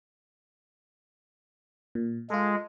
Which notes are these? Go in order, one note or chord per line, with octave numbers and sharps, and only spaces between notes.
A#2
G#3 F4 A4